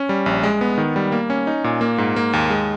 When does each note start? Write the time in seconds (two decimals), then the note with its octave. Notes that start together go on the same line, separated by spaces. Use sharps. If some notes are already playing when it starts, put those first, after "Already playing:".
Already playing: C#4
0.09 G3
0.26 A#1
0.43 G#3
0.61 B3
0.78 D#3
0.96 G3
1.12 A#3
1.30 C#4
1.47 D#4
1.64 A#2
1.81 A#3
1.98 G#2
2.16 A#3
2.33 D#2
2.50 G#3